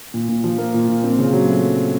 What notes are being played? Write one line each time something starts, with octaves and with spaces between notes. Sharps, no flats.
A#2
A#2
F3
A#3
A#2
A#2
C4
C#3
F#3
A3